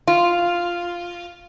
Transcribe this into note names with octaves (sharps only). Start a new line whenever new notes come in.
F4